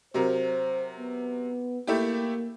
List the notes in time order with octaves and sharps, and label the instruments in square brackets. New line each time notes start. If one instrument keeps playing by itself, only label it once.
[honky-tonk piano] C3 F#3 A#4 [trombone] C5
[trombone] B3
[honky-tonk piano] A3 E4 G4 [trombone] A#3